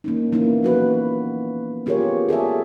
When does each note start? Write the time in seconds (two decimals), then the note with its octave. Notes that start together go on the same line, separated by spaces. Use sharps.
0.04 A#3 C#4 D#4
0.32 E3 A#3 B3 D#4 E4
0.63 F3 F#4 B4
1.86 B3 F4 G4 G#4 A#4 C#5
2.29 G#4 A4 D5 E5